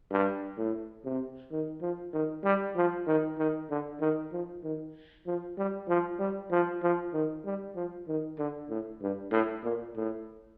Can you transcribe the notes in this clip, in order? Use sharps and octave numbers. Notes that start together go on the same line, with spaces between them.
G2
A2
C3
D#3
F3
D#3
G3
F3
D#3
D#3
D3
D#3
F3
D#3
F3
G3
F3
G3
F3
F3
D#3
G3
F3
D#3
D3
A2
G2
A2
A#2
A2